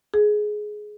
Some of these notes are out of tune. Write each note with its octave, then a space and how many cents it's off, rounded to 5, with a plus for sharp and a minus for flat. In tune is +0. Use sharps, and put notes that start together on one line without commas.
G#4 +15